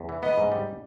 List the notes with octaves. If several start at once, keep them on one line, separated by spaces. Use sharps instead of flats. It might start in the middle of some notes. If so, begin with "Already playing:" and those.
Already playing: E2
E3
B3 D#5
G#2
G3